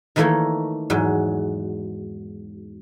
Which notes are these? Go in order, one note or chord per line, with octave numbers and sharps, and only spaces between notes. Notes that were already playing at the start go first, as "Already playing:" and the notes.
D#3 E3 A3 A#3 A4 C#5
E2 G#2 F#3